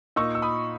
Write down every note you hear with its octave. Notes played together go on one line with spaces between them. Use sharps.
A#2 A#3 D#4 C#6 E6
E6
B5 D#6